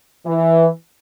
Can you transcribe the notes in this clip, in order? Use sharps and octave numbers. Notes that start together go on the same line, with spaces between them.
E3